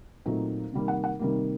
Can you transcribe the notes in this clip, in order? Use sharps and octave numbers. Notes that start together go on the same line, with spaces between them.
A#2 F#3 A3 C4 D#4
C3 D#3 G3 A#3
F#5
F#5
C3 D#3 G3 A#3